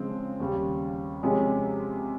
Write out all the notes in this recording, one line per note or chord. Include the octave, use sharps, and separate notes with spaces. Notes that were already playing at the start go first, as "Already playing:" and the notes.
Already playing: C#3 F3 G#3 C4
D#2 C#3 G3
C3 F3 G#3 C#4 G#4